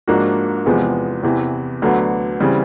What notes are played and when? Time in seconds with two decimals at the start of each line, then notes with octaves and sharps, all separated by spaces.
0.08 G#2 F3 A#3 D4 F#4
0.66 E2 C3 F3 G#3 B3
1.23 E2 C3 E3
1.82 D2 D3 F#3 B3
2.40 C#3 E3 G3 C4